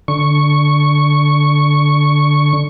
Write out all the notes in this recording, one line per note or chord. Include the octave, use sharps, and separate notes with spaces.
D3 C#6